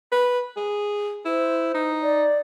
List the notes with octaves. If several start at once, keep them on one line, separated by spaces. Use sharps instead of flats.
B4
G#4
E4 C5
D#4
D5